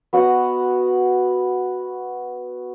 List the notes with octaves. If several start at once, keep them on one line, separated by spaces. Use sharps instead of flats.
B3 F#4 D#5 F#5